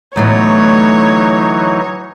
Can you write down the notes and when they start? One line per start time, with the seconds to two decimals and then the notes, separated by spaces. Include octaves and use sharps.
0.16 D2 A2 E3 F#3 B3 D#4 C#5